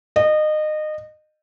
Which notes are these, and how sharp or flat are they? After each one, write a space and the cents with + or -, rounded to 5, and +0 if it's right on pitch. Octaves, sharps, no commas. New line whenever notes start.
D#5 -25